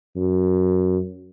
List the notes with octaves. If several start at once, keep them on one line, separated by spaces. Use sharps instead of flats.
F#2